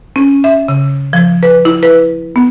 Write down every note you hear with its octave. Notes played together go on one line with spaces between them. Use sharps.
C#4
E5
C#3
F3
B4
E4
B4
B3